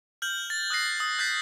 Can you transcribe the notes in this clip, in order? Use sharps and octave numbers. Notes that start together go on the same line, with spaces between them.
F6 G6 F#7
A6
D#6 F#6 G6 A#6 C7
D#6
F#6 G6 A6 B6